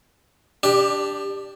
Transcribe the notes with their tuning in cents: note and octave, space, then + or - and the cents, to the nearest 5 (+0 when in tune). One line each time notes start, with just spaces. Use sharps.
D4 +0 G4 +5 D5 +35